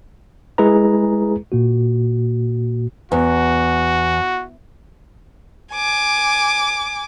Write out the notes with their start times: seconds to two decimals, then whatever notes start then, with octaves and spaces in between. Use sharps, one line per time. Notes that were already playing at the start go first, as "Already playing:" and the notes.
0.58 G#3 E4 G#4 B4 A#5
1.52 A#2 A#3 F#4
3.12 E2 F#4
5.73 G#5 D6